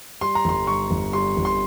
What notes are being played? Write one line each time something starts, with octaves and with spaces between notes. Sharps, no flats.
G3 C6
A#5
G1 C6
G2 C#6
G1
G3 C6
G1
C6